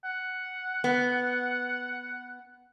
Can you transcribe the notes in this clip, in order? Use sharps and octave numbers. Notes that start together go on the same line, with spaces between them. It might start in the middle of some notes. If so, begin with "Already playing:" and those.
F#5
B3